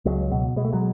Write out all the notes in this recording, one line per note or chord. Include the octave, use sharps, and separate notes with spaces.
C#2 F#3 G#3
B2
B2 G#3
A3
F#3 G#3